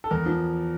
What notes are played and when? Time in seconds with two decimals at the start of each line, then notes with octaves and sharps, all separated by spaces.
0.04 A4
0.11 E2 A#4
0.26 F3